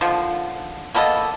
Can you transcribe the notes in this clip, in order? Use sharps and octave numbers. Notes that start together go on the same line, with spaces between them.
D3 D#3 F3
A#3 B3 A4 D#5